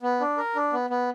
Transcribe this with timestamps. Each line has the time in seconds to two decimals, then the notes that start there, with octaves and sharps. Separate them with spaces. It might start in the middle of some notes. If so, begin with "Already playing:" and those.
0.03 B3
0.20 D4
0.38 A#4
0.55 D4
0.73 B3
0.90 B3